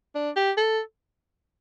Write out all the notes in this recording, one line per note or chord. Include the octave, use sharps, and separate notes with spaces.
D4
G4
A4